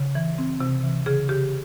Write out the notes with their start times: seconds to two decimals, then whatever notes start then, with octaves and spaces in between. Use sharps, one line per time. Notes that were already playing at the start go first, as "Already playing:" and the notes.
Already playing: C#3
0.15 E3
0.38 C4
0.60 C3
0.83 E3
1.06 C#3 G#4
1.29 C#3 G4